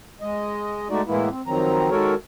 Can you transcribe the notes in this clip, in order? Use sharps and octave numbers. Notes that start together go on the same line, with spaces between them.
G#3 D#5
G#3 A3 D#4 F#4 D5
A2 E3 G#3 A#3 B3 E4
C4
D#3 F3 F#3 C4 A#5
D#3 G#3 F#4 A4 A#4 C#5